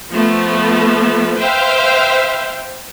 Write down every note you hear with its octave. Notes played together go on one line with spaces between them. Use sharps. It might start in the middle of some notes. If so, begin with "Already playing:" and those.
F3 A3 B3
B4 C5 E5 F5 G5